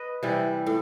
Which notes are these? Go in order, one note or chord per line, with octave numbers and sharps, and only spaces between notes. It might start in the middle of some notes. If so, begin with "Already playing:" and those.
Already playing: B4 D#5
C3 E3 G3
A2